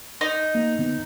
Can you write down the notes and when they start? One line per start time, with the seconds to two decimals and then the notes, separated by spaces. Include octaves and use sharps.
0.21 D#4
0.55 A#3
0.79 D3 B3